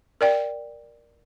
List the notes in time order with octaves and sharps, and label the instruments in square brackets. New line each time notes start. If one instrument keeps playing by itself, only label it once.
[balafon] A#4 D5 G5